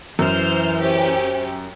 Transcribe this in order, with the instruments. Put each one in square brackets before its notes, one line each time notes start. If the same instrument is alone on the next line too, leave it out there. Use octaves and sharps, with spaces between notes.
[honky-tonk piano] F#2 [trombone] E3 [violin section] C5 F6 G6
[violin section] C#4 G4 [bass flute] C5